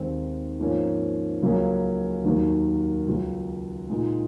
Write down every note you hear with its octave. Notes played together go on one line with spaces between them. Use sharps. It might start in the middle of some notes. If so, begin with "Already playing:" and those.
Already playing: D#2 D#3 G#3 C4
G#2 F3 A#3 C#4
C#2 C#3 F#3 A#3 C#4
D#2 D#3 F#3 A#3
C#2 C#3 F#3
A#2 G#3 D#4